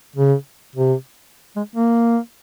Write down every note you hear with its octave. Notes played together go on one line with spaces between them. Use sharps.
C#3
C3
G#3
A#3